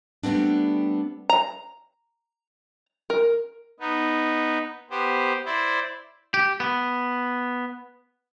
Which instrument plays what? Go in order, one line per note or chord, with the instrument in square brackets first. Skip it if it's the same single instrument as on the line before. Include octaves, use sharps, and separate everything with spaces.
[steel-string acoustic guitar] G3 A3 B3 C4 D4
[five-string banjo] A#5
A#4
[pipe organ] B3 D#4
B3 G4 C5
E4 C5 D5
[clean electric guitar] G4
B3